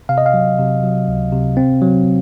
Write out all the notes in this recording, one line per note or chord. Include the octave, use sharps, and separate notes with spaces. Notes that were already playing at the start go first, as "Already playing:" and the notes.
C3 F5
D#5
F5
F#3
C3
F#3
C#2
C3
C4
F#3